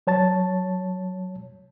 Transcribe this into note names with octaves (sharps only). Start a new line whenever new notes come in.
F#3 C#5 A5 A6